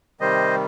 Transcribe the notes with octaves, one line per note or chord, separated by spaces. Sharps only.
C3 D#3 G3 C5 D#5